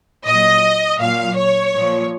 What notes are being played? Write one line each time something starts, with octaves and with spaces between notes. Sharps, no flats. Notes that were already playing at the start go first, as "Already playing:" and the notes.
A#2 F#3 D#5
A#2 F#3 F5
C#5
A#2 F3